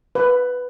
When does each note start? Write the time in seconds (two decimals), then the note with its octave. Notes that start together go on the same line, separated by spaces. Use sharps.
0.15 B4